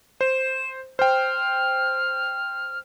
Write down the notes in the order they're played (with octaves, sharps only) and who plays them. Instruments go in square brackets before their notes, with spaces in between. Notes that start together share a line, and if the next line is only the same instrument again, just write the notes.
[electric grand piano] C5 [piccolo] E7
[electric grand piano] C5 G5 [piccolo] F6